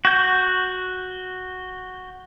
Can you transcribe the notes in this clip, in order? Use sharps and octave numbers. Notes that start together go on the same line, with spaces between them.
F#4 G6